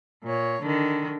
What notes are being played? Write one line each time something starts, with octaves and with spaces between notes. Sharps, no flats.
A#2 C#5
D3 D#3